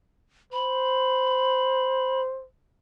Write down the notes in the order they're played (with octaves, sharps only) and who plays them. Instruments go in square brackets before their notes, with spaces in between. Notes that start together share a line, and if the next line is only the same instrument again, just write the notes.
[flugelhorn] C5 [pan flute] B5